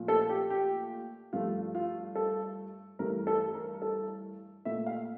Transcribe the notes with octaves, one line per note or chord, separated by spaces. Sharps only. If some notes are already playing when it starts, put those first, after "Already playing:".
Already playing: A#2 F3 A3
A4
G4
G4
G2 F3 A3 F4
F4
A4
G2 E3 A3 A#4
A4
A#4
A4
A#2 A3 E5
F5